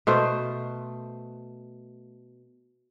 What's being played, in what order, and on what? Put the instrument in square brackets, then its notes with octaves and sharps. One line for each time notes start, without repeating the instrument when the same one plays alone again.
[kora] B2 A3 C5